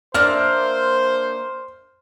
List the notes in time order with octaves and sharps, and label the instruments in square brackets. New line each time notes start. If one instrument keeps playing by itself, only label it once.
[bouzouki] A#3 D4 E5 [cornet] C5 [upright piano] F6